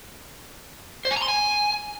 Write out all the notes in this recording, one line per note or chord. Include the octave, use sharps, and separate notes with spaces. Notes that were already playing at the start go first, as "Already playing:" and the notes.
C5
G#5
A#5
C6
G#5